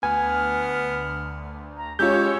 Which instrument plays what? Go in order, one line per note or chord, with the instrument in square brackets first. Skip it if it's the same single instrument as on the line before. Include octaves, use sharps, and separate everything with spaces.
[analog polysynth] D2 [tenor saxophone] B3 [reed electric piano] G#5 [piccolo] F6
[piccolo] A#5
[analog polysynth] G#3 C#4 C#5 [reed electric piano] F4 G6 [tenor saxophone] G4 [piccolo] E6